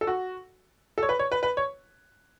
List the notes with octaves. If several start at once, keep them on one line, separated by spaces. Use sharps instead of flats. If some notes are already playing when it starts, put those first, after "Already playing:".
A4
F#4
A4
C#5
B4
C#5
B4
B4
C#5